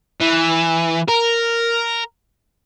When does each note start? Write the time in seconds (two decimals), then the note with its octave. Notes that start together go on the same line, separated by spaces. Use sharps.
0.20 E3
1.08 A#4